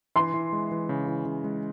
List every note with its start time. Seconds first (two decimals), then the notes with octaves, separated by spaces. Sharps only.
0.16 E3 C6
0.34 E3
0.53 G#3
0.71 E3
0.89 C#3
1.07 E3
1.26 C#3
1.44 G#3